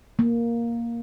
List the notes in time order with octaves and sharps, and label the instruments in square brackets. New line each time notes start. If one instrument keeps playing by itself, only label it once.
[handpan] A#3